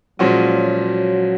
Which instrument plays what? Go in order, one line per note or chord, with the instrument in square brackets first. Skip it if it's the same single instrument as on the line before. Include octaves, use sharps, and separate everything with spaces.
[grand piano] A#2 F3 G#3 C#4 F#4 [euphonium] F#3